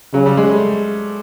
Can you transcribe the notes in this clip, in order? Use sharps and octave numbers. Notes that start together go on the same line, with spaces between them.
C#3 F#3
G3
G#3
A3